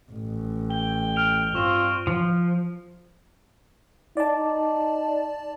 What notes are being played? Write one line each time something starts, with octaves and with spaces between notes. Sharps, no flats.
A1
G5 G7
F6 D7 F7
G2 C4 F4 C#6 E7
F3
D#4 D5 A5